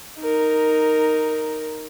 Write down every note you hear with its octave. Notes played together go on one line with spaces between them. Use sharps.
D#4 A#4